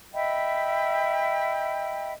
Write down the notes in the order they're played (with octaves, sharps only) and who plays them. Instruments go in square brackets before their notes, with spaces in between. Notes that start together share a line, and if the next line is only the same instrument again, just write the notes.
[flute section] D#5 E5 G5 B5